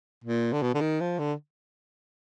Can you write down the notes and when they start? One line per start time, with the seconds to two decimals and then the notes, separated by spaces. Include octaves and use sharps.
0.24 A#2
0.53 D3
0.62 B2
0.74 D3
0.81 D#3
1.01 F3
1.19 D3